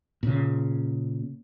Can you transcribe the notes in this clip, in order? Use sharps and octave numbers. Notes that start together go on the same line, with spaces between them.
A#2 C#3